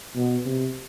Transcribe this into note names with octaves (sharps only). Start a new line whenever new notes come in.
B2
C3